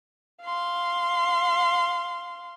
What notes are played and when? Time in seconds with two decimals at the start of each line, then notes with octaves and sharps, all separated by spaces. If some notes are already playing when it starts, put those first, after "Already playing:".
0.43 F5 C6